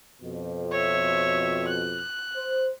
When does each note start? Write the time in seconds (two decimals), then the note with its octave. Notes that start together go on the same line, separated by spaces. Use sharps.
0.22 F2 B2
0.72 C#5 E5
1.68 F#6
2.35 C5